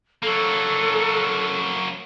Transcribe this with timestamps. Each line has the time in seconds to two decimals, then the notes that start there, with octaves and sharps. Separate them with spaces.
0.23 F#3 A#3 A4